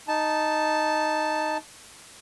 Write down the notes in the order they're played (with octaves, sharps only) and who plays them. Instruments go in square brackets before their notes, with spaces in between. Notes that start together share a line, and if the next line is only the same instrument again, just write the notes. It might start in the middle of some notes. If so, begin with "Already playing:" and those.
[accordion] D#4 A5